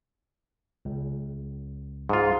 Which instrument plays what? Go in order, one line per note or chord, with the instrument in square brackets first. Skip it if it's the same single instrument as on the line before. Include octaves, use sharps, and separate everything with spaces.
[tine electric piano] C#2
[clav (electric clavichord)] G#2 F4